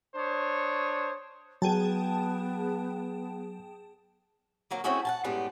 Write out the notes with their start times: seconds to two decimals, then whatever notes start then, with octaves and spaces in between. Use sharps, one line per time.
0.16 D4 C5 C#5 D#6
1.62 F#3 B3 G#4 G5 A5
4.71 D2 F#3 A#3
4.84 A3 C4 C#4 E4 F#4 G#4
5.05 F#5 G#5 A5
5.24 F#2 A2 G3 G#3 B3 D4